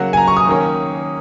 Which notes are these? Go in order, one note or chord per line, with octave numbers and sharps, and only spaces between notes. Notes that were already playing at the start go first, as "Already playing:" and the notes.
Already playing: C#3 F#3 A#3 F#5
G#5
A#5
C#6
D#6
D#3 A#3 C#4